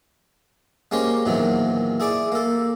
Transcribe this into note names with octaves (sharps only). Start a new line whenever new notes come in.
G#3 A#3 C#4 G4 C5 C#5
E2 A#2 D#3 E3 F#3 C4
E4 G#4 D5 D6
A#3 A4